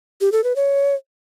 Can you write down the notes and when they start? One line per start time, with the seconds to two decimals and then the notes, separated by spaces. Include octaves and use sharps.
0.21 G4
0.32 A4
0.44 B4
0.56 C#5